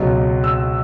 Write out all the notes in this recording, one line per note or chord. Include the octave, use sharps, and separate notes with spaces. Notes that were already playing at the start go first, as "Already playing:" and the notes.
Already playing: C#2 B2 F#3
E6